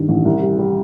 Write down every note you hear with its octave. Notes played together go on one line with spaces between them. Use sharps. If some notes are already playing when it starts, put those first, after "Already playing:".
Already playing: G2 D#3
A1
C2
G3
G3